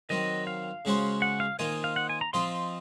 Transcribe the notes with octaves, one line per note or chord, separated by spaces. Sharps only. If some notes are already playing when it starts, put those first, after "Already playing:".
D#3 F#3 C4 D#5
F5
C#3 G#3 C#4 F#4 C5
F#5
F5
D#3 A#3 F4 C5 D#5 G#5
F5
F#5
G#5
A#5
F3 C4 F4 C5 D#5 C6